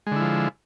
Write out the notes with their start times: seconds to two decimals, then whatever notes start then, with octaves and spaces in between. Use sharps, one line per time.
0.07 G#3
0.11 D3
0.16 E4
0.21 F3